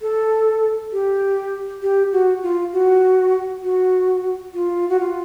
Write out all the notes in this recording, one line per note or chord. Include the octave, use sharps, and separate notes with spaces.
A4
G4
G4
F#4
F4
F#4
F#4
F4
F#4
F4